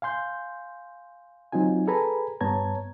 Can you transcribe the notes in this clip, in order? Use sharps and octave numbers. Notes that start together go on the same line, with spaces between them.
F5 G#5 C6 G6
F#3 C4 D#4 F4 G#5
G#4 A4 B4 G#5 A#5 B5
G2 B3 C#5 A5 A#5 G#6